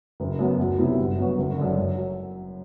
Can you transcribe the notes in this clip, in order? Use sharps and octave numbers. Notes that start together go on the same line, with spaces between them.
F#1
F#2 F#3 B3
D2
C3 F#3 B3 E4
G1
F#2 F#3 B3 F#4
F#1
F#2 D3
F#2
F#3